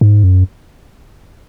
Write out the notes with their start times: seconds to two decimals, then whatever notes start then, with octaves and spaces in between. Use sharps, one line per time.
0.01 G#2
0.24 F#2